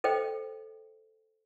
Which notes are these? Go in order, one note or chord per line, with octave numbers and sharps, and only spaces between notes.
A4 C5 D#5 G5